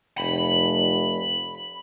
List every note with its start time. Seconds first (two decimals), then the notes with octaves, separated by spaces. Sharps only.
0.18 F1 B5